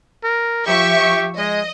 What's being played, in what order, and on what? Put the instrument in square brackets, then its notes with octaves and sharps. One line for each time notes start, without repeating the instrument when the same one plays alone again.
[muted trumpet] A#4
[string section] F3 E5 C#6 [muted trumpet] G4
[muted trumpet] G#3 [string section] D#5